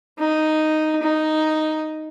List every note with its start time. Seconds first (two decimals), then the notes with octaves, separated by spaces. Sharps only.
0.19 D#4
1.03 D#4